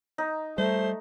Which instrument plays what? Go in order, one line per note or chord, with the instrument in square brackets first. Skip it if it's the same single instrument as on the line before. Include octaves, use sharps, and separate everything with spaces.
[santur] D#4
[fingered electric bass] G3 [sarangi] A3 [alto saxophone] C5